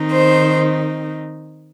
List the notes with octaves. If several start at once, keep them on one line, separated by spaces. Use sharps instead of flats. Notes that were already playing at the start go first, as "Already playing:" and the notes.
Already playing: D#3 C4 D#4
C5